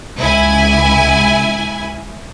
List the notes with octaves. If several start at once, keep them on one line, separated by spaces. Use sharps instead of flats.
C#2 E4 G#5